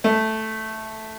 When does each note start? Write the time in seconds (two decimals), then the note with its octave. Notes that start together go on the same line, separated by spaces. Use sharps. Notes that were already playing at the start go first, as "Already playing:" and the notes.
0.04 A3